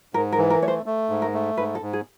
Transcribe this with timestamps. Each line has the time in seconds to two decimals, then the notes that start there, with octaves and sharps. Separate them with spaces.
0.14 G#2 A#4
0.32 A#4
0.38 E3
0.50 A#4
0.62 A3 C#5
0.68 C5
0.86 A3
1.09 G#2
1.22 A#4
1.34 A3
1.57 G#2 B4
1.75 A4
1.81 G#2
1.93 G#4